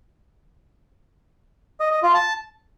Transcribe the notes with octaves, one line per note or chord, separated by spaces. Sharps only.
D#5
D#5
F4
A5